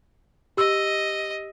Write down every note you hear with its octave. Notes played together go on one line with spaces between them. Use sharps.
G4 D#5 E6